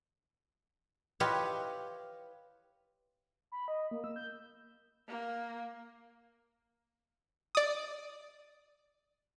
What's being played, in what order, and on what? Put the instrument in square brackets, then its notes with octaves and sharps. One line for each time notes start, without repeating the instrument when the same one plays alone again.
[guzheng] E4 F4 G4 B4 C#5 D#5
[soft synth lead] B5
D#5
A#3
E6
G6
[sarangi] A#3
[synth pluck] D5 D#6